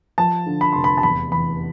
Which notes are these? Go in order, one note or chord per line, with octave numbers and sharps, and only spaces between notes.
F3 A5
D3
B5
F1 C6
B5
A5
E2 B5
E3 B5